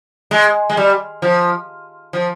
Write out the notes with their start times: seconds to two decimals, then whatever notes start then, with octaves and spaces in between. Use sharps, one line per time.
0.31 G#3
0.70 G#3
0.77 G3
1.22 F3
2.13 F3